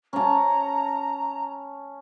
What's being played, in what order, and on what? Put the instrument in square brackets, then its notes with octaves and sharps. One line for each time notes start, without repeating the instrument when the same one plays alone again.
[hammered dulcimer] C#4 A5 [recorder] A#5